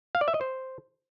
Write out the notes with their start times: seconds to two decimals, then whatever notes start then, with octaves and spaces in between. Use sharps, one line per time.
0.15 F5
0.21 D5
0.28 E5
0.34 D#5
0.41 C5